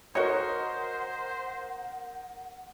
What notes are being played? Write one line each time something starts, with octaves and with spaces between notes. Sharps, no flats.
F#4 A#4 C5 C#5 D#5 F#5